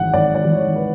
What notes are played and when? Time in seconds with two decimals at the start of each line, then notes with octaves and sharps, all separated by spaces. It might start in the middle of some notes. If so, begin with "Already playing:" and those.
Already playing: G#1 G#2 E3 F#5
0.13 G#1 D5
0.35 D5
0.45 G#2 E3
0.54 C#5
0.76 B4